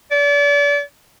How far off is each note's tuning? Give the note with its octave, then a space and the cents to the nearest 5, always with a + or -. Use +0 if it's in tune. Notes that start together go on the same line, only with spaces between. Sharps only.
D5 -35